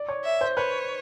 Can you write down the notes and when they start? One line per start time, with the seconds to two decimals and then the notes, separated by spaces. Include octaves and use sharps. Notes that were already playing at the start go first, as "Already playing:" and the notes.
Already playing: D5
0.09 C#5
0.25 E5
0.41 C5
0.57 B4 C#5